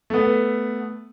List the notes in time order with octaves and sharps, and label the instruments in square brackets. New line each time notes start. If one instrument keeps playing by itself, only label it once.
[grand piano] A3 B3